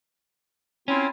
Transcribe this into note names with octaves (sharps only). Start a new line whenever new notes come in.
C4 C#4 E4 F4